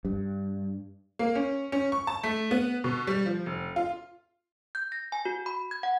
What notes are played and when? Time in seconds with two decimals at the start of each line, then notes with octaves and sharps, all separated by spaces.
0.05 G2
1.19 A#3
1.35 C#4
1.72 C#4
1.92 C#6
2.07 A5
2.23 A3
2.51 B3
2.84 B2
3.07 G3
3.26 F3
3.46 F1
3.76 F4
4.75 G6
4.92 A#6
5.12 G#5
5.25 F#4
5.46 B5
5.71 G#6
5.83 F#5